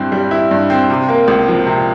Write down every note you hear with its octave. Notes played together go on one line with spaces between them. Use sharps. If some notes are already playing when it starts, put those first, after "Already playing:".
Already playing: G2 G3 C4 E4
G3
E4
G2
C4
C3
A#3
C#2
F3
C3